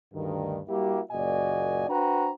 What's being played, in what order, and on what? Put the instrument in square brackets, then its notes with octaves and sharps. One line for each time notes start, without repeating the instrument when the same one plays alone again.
[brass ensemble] D2 G2 D#3
G3 A#3 E4 F#4 G4
F#1 A#2 F#4 D5 D#5 G#5
D4 F#4 B4 C5 G5 A#5